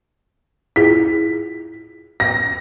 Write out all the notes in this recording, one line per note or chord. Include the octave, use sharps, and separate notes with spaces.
E4 F4 G#4 B6
A#6